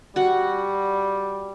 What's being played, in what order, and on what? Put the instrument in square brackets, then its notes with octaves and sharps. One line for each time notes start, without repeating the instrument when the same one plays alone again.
[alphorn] G3 [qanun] F#4 F#5